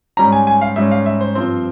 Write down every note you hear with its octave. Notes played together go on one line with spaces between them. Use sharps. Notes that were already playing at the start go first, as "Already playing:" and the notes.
G#2 G3 C#4 A#5
G#5
G#5
F5
G#2 G3 C#4 E5
F5
E5
C5
G2 F3 C4